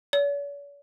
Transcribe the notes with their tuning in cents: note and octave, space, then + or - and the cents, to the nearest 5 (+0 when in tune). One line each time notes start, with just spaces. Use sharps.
C#5 +45